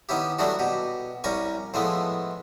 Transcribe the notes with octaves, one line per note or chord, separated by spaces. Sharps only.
D#3 B3 C#4 E4 G4
F#3 G3 A3 B3 D4 F#4
B2 G4
C2 G3 C#4 A#4 C#6
A2 E3 F3 G#3 A3 B3